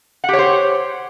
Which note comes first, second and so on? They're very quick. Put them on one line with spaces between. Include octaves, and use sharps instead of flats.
F#5 G4 C#5 C5